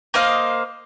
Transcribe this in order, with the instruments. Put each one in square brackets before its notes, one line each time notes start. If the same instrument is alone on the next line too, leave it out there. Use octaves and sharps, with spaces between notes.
[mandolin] A#3 C5 D#5 F5